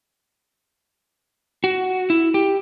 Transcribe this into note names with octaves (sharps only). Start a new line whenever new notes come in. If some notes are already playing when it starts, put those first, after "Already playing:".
F#4
E4
G4